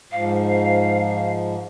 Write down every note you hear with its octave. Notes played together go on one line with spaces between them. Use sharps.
G#2 F3 F5